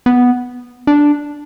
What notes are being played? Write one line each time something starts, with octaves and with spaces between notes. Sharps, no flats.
B3
D4